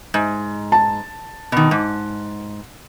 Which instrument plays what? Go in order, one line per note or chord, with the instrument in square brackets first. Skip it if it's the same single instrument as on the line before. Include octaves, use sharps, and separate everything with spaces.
[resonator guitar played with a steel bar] G#2
[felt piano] A5
[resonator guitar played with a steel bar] B2 D#3
G#2